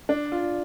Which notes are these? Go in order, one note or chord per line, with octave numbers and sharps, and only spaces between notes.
D4
F4